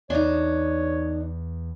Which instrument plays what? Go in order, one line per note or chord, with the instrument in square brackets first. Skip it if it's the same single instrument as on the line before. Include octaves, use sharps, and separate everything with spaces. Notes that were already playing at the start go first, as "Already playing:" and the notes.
[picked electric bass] E2 [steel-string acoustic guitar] D4 D#4 [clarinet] C#5